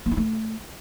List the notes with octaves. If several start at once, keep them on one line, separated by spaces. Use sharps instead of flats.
A#3
E4
A3